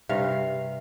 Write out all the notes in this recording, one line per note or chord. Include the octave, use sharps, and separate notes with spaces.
G2 C3 F5